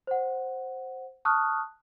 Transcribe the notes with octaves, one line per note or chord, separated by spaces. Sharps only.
C5 F#5
A5 C#6 D#6 F6 F#6